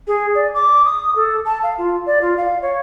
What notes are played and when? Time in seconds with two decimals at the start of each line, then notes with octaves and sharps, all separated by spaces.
0.07 G#4
0.35 D5
0.54 D6
0.85 D#6
1.15 A4
1.45 A5
1.63 F5
1.78 F4
2.06 D5
2.21 F4
2.37 F5
2.62 C#5